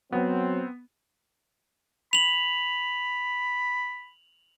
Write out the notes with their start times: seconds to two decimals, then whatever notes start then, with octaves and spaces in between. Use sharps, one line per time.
0.12 F#3 B3 C4
2.13 B5 F7 F#7